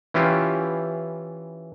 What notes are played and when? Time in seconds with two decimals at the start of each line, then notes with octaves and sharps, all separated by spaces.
0.14 E3 C#4 E4 F4 G4